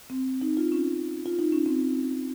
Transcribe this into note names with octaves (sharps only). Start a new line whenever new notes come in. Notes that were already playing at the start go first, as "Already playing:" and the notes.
C4
D#4
F4
C#4
F4
D#4
C#4
C4